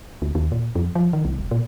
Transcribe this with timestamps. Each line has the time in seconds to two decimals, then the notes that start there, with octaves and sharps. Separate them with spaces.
0.22 D2
0.35 D#2
0.52 A#2
0.75 F2
0.95 F3
1.13 D#3
1.25 C2
1.38 E1
1.51 A#2